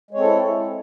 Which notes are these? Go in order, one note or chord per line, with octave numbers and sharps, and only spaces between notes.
G#3 C4 E4 A4 C#5